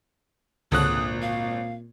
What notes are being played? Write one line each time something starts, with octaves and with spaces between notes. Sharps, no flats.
G#1 C#2 A#2 D3 C#5 D#6 F#6
F5